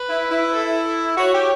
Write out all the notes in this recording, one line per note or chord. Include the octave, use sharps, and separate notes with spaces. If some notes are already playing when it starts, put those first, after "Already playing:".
Already playing: B4
E4
E4
A4
F#4 C#5
G4